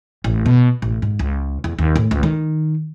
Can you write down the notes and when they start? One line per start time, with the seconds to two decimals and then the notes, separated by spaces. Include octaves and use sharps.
0.24 A1
0.46 B2
0.82 A1
1.02 G#2
1.19 C#2
1.64 E2
1.79 D#2
1.96 A2
2.11 C#2
2.23 D#3